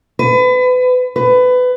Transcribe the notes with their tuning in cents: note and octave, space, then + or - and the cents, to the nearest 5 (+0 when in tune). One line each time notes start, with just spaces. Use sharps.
B4 +30
B4 +20